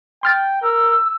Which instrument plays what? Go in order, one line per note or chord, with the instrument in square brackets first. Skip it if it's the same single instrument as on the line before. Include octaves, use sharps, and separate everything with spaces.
[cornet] G5 [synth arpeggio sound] C6 F6 A6
[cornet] A#4 [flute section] E6